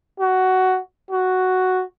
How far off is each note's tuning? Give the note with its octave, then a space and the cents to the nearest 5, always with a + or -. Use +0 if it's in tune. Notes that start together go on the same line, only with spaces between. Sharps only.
F#4 +10
F#4 +0